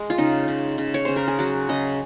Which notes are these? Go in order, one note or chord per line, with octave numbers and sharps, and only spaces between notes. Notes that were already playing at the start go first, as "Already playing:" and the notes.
Already playing: G#3
F4
C#3 D#4
C#3
C#3
C#5
C#3 C5
A#4
G#4
F#3 F#4
C#3 D#5